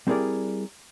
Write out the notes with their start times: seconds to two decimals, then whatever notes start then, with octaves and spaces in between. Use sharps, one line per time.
0.07 G3 C4 E4 G#4 A#4 D5